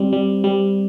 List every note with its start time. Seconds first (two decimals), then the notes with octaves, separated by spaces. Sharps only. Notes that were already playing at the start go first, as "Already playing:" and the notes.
Already playing: G3 C4
0.13 G3
0.44 G3